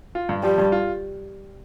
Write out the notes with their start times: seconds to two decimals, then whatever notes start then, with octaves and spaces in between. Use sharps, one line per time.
0.15 F4
0.29 G2
0.43 F3 G3
0.58 G2
0.72 F4